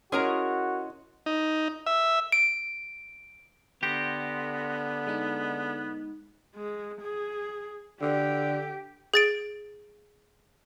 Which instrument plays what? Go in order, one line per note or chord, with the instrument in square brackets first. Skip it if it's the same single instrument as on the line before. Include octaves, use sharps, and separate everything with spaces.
[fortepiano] C#4 [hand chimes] E4 D#5 C6 [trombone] F#4 [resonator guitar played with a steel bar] G#4 A#4 A#5
[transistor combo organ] D#4
E5
[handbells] D7
[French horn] D3 [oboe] B3 [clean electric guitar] G4 [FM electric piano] C6 A#6 C#7
[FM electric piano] G#3 D#4
[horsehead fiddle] G#3
G#4
[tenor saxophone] D3 [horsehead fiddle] G4
[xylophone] G#4 A6 D7